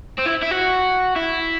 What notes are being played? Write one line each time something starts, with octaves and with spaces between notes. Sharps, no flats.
C4
E4
E4
F#4
E4